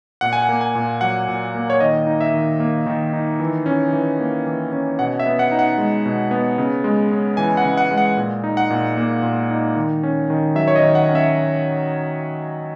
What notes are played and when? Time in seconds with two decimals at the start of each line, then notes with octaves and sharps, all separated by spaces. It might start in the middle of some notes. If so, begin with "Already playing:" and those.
0.21 A#2 F#5
0.33 G#5
0.42 F#5
0.49 A#3
0.61 G#5
0.75 A#2
1.01 F#3 F#5
1.28 A#2
1.55 A#3
1.70 C#5
1.80 D#3 D#5
2.07 D#4
2.21 E5
2.34 D#3
2.60 A#3
2.87 D#3
3.13 D#4
3.40 E3
3.66 C#4
3.93 E3
4.20 A#3
4.46 E3
4.73 C#4
4.99 B2 F#5
5.19 E5
5.26 B3
5.39 F#5
5.52 D#4
5.59 F#5
5.78 G#3
6.06 B2
6.31 B3
6.58 C#3
6.84 G#3
7.12 C#4
7.37 E3 G#5
7.57 F#5
7.64 C#3
7.77 F#5
7.91 G#3
7.98 F#5
8.17 A#2
8.44 D#4
8.57 F#5
8.70 A#2
8.97 A#3
9.23 A#2
9.50 D#4
9.76 D#3
10.03 C#4
10.30 D#3
10.55 F#3 E5
10.68 C#5
10.75 D#5
10.82 D#3
10.95 F#5
11.09 C#4
11.15 E5